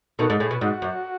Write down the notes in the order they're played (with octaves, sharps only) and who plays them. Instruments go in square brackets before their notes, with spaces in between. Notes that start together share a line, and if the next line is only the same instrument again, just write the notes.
[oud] B2 D#3 [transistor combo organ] A4
[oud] G#2
[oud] A2 [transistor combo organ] G#4
[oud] B2
[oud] G#2 [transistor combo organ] F#4
[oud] F#2